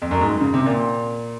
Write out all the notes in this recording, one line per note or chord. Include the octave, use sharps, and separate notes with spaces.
F2
F#2
G#2
C#3
C3
A#2